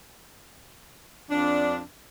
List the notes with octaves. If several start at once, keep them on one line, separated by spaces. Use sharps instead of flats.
F2 D4